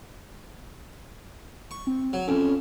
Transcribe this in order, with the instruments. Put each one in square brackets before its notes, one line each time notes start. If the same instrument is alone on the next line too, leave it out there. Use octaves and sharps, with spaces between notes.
[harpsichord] C#6
[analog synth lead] C4
[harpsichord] F#3
[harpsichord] F2 [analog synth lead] C#4